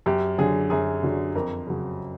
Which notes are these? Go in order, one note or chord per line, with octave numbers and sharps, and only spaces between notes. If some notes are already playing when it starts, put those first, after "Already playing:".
F#2 G4
D3 F#3 G#4
F#2 G#4
D3 F#3
F2 A#4
C#3 F#3